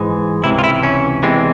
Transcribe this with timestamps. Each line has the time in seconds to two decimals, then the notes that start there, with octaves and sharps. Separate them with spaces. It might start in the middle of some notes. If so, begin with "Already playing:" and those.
Already playing: G#2 E3 G#3
0.43 C#2 C3 E3 E4
0.59 F4
0.64 E4
0.83 C#4
1.23 E2 C3 E3 G#3 C4